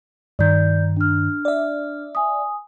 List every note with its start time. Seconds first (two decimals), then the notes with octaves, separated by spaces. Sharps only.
0.39 G2 D#3 D5 G6
0.97 D4 F6
1.45 D5 E5
2.15 G#5 D#6